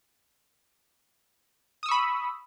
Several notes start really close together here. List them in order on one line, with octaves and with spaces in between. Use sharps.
D#6 E6 C#6 B5